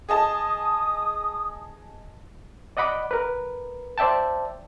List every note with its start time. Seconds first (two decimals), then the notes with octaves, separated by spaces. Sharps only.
0.09 G#4 D#5 A5 D#6
2.77 D5 D#5 F#5 B5 D6
3.11 A#4 B4
3.98 C5 D5 E5 G5 A5